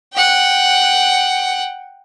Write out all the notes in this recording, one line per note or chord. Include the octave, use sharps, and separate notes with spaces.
F#5 G5